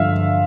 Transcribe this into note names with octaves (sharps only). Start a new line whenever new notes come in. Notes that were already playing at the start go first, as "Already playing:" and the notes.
Already playing: G2 D3 F3 E5 F5